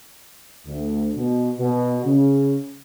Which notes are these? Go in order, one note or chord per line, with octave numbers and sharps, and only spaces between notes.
D2
B2
B2
C#3